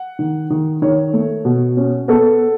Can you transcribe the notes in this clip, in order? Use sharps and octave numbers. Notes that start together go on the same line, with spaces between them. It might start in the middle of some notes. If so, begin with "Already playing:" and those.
Already playing: F#5
D#3
D#3
D#3 C#5
A3
B2
C#4
B3 A4